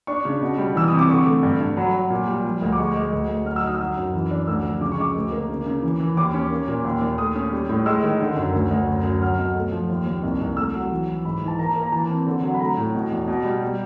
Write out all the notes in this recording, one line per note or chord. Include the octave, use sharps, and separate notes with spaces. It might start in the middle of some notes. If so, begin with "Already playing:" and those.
D4 C#6
C#3
B2
G3
E3 E6
C3 D#6
D6
D3 C#6
A3
G2
G2
F#3 B5
F#3
A#2
G3
F3
D2
D6
G#3 C#6
G#3
D2
D2
F#3 F6
E6
D#4 D#6
E6
F#3
F#2
E3
D4
D2 E6
F3
C#3 D6
C#6
G#3 D6
D2
A#3
C#3
C#3
E3
E3
D#2 D6
C#4
A#3
A#2
D#2
D#2
A3 D#6
C#4
G3
A2
G#3 E6
D#3
D3
F#2
D2
D2
F#2
F#2
F#3 F6
B2
A3
F3
D#2
D#2
C2
C2
A3 E6
F#3
E3
E3
G#2 B5
E3
A5
A#3 A#5
A#3
A#5
E3 A5
C4
D3
F#3
B5
A3 A#5
A2
B2
E2
B2
G3
G3